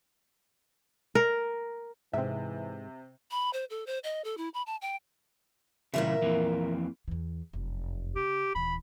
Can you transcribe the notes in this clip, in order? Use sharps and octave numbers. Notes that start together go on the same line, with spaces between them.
A#4
G#2 C3 E3 C4 E5
B5
C5
A4
C5
D#5
A4
E4
B5
A5
G5
A#2 C#3 E3 G3 A#4 E5
F2 E3 A#3
E2 E3
F1 F#2
C#3 G4
D#1 E3 B5